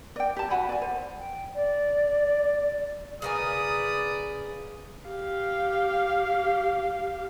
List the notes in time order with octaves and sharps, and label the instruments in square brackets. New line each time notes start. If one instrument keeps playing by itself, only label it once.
[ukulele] D5 G5
G4 A5
F#4 F#5 G#5 B5
D5 G#5
C5
[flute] G5
D5
[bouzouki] C#3 A#4 G#5 [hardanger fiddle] B4 D5 [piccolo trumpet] D#6
[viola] G4 F5